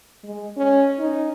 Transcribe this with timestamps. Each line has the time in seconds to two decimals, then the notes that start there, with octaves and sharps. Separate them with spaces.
0.24 G#3
0.57 C#4
0.99 D#4